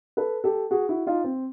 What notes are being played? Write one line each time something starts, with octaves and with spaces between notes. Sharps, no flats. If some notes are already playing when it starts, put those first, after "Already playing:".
A4 B4
G4 A4
F#4 G#4
E4 F#4
D#4 F4
C4